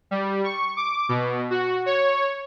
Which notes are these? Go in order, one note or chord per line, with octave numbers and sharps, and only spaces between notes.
G3
C#6
D6
B2
F#4
C#5